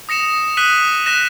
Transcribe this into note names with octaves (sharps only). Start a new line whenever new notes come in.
D#6 A#6 C#7 E7
D#6 F#6 B6 D#7 F#7
F#6 A#6 E7